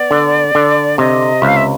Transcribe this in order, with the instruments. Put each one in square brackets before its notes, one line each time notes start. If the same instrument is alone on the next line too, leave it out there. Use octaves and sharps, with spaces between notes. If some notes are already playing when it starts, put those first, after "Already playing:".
Already playing: [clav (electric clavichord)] B3 [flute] D5
[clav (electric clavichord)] D3
D3
[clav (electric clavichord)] C3 [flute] D#5
[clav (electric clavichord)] C#2 [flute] E5
[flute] F5
E5